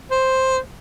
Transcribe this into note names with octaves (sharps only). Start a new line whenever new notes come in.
C5